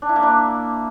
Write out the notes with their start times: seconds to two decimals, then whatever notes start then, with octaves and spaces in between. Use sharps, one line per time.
0.02 D4
0.09 E4
0.16 A#3
0.23 D4